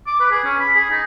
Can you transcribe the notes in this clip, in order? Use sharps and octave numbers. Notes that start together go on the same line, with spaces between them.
D6
B4
G#4
C#4
B5
G#4
D#4